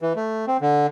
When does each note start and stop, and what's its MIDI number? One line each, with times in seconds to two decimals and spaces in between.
0.02 0.13 52
0.16 0.45 57
0.47 0.57 60
0.61 0.87 50